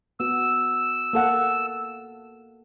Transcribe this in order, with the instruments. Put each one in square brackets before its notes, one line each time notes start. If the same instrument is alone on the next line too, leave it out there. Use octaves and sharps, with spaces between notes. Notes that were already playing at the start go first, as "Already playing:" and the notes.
[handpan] B3 F#4 [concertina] E6
[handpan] A#3 A4 F#5